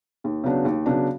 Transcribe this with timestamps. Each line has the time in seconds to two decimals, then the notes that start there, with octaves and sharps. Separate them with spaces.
0.24 D#2
0.44 C#3 F#3 B3 D4
0.65 D#2
0.86 C#3 F#3 B3 D4